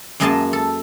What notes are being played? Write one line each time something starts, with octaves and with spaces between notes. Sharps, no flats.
F#2 G#3 A#3 D#5 E5 A5
A4